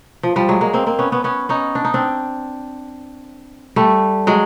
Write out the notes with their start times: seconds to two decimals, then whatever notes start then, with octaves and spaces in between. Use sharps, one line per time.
0.23 F3
0.36 F3 G3
0.49 F#3 G#3
0.61 G#3 A#3
0.73 A#3 C4
0.86 A#3 C4
0.99 B3 C#4
1.12 B3 C#4
1.24 B3 C#4
1.49 C#4 D#4
1.75 D4
1.85 D#4
1.94 C4 D4
3.76 G3 A3
4.27 F#3 G#3